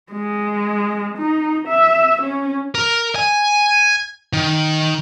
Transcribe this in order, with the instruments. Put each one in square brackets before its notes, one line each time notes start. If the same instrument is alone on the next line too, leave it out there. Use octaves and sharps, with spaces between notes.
[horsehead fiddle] G#3
D#4
E5
C#4
[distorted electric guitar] A#4
G#5
D#3